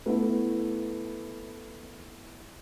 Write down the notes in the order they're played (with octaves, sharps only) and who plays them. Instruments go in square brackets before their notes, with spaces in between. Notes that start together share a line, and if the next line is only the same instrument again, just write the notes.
[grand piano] A3 B3 E4